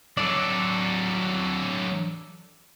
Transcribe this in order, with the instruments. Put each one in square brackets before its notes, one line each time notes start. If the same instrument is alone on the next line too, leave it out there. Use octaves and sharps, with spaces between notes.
[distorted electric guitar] F#3 D4 [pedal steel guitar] A4 D5